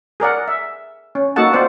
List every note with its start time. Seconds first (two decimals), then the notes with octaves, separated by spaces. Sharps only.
0.20 G#4 A#4 D5 F#5
0.48 E5
1.15 C#4
1.36 A#3 D#4 F#4 A4 F#5 A5
1.53 C4 F4 C5 D5 F#5